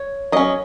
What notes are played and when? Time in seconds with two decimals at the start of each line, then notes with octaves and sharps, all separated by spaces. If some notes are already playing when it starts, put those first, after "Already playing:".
Already playing: C#5
0.32 F#3 C#4 D#5